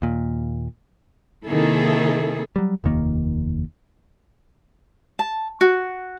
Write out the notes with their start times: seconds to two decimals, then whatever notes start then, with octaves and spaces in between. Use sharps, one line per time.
0.02 D#2 A#2
1.46 C3 D#3 A#3 E4 G#4 A4
2.56 F#3 G3
2.84 F1 D#2 D#3 A#3
5.19 A5
5.61 F#4